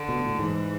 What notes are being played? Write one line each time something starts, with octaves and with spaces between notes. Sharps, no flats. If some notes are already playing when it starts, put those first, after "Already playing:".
Already playing: D3
B2
A2
G#2 E3